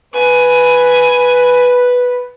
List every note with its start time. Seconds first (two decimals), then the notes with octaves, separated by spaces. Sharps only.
0.14 B4 G#5